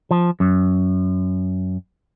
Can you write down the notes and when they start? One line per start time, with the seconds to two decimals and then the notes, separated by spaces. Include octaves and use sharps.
0.11 F3
0.40 F#2